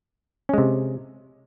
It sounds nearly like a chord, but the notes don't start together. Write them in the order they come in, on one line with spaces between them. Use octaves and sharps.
C#4 G#3 C3